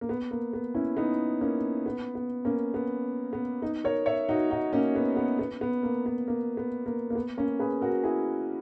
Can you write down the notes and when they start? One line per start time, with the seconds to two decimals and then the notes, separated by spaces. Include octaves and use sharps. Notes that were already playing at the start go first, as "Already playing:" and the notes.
0.01 A#3
0.09 B3
0.31 A#3
0.53 B3
0.75 C#4 E4
0.97 B3 D#4
1.41 A#3 C#4
1.86 B3
2.15 B3
2.45 A#3 C#4
2.74 B3
3.33 B3
3.62 B3 D#4
3.84 A#4 C#5
4.06 C#5 E5
4.29 D#4 F#4
4.51 D#4 F#4
4.73 A#3 C#4
4.95 B3
5.16 B3
5.39 B3
5.61 B3
5.83 A#3
6.06 B3
6.28 A#3
6.57 B3
6.86 A#3
7.10 A#3
7.15 B3
7.37 A#3 C#4
7.60 G#4 B4
7.81 F#4 A#4
8.04 E4 G#4